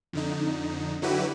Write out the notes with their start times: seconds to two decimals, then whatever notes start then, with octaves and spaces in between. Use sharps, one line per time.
0.13 F2 D3 D#4
1.02 D3 F#3 E4 F#4 G4 B4